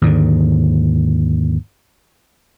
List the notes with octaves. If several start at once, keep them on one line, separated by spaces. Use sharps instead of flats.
D#2 G#2 D3